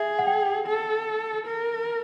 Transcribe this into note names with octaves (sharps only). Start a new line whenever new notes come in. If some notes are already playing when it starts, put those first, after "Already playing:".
Already playing: G#4 E5
F#5
G5
A4
A#4